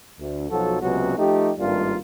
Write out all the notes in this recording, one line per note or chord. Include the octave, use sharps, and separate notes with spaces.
D2
B1 F3 F#3 F#4 A4
C#2 C3 F#3 B3 C#4 F#4
F3 A3 D#4 G4
G#1 G2 G3 A3 A#3 F4